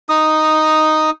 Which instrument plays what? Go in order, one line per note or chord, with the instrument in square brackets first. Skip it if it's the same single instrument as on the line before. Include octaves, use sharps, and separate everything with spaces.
[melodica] D#4 D#6